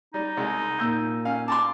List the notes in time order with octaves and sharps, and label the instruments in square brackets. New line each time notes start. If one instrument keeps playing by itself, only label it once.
[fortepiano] G3 [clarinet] D#4
[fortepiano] C2 G#3
[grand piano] A#2 E6 G6
[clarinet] C#4 [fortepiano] F5
[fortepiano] A5 A#5 C6 [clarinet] D6